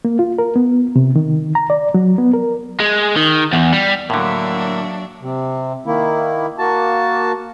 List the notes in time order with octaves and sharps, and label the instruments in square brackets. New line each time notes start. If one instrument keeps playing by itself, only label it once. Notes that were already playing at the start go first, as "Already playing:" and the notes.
[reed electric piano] A#3
F4
A#4
B3
C3
D#3
A#5
D5
F#3
B3
A#4
[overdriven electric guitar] G#3
D#3
E2
G3
[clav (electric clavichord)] A2 D3 [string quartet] F#3 D4 [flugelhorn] A#3 [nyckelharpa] F#4 E5
[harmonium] C3
D#3 A#3 E4
A#3 F#4 A5